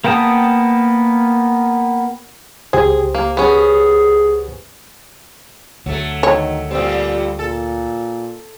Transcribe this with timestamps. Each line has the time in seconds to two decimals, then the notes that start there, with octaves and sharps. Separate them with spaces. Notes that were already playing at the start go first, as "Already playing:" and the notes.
0.04 A#3 B3 G5 A5 D#6
2.73 C#2 G4 G#4 C5
3.15 A#3
3.37 B3 C#4 G#4
5.86 D2 F#3 A3
6.23 D#3 C#5
6.71 A#2 G3 A3 C4
7.39 A#2 A4